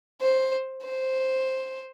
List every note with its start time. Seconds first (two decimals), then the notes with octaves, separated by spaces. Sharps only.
0.21 C5
0.83 C5